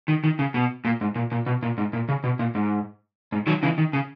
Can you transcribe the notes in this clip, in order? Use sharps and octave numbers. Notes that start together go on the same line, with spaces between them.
D#3
D#3
C#3
B2
A#2
G#2
A#2
A#2
B2
A#2
G#2
A#2
C#3
B2
A#2
G#2
G#2
D#3 F#3
C#3 E3
D#3
C#3